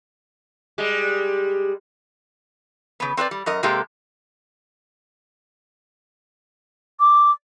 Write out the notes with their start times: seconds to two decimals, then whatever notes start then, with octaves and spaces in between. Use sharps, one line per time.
0.78 G3 G#3
3.00 C#3 B3
3.17 C4 B4 C5 D5
3.31 G3
3.46 F#2 A#4 D#5
3.63 C3 G#3 A#3 G4 A4
7.00 D6